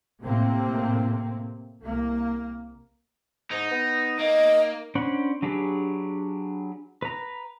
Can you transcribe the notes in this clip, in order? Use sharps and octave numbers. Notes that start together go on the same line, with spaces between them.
A2 C3 A#3 C4
C2 A#3
G#2 D#4
B3
A#3 D#4 D#5
C#4 D4 C5 F#5 B5
F#3 D4 G4 G#4 B4
B4 A#5